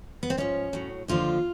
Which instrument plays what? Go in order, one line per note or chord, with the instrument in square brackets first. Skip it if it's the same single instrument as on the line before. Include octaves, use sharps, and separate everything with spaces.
[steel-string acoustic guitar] B3
C4
G#2 F3 C#4
A2 F#3
D#2 D3 F3 F4